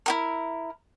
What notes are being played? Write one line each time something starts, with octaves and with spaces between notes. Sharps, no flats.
E4 F#4 A#4